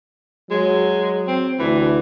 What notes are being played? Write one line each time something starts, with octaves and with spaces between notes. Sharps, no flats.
F#3 G#3
C4
D2 E3